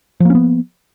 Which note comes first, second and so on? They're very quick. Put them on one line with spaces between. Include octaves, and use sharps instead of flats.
F3 A#3 C#4 B3